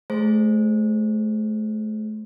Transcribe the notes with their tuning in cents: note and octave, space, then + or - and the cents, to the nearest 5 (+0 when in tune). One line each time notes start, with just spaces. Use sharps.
A3 -35 G#4 +0 C5 +0